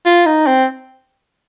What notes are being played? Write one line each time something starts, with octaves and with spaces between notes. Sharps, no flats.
F4
D#4
C4